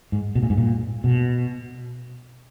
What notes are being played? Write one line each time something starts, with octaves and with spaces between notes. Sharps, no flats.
G#2
B2
A#2
G#2
A#2
B2